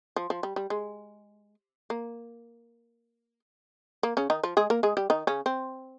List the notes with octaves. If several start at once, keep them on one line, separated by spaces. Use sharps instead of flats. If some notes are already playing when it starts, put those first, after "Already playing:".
F3
F3
G3
G3
G#3
A#3
A#3
C#3 C#4
D#3 D#4
F3 F4
G#3 G#4
A#3 A#4
G#3 G#4
G3 G4
D#3 D#4
C#3 C#4
C4